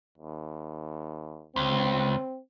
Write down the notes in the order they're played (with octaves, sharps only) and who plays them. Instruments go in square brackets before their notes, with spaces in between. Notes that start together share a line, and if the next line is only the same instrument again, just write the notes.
[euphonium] D#2
[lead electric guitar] C#2 [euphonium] C4